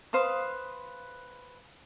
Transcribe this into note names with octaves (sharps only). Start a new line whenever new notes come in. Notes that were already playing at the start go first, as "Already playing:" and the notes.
B4 C5 F5 D#6